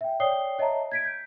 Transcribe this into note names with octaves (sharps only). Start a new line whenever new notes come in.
E5 G5
C#5 D5 G5 D#6 C7 G7
C#5 D#5 E5 A5 A#5
G#6 B6 D7
G6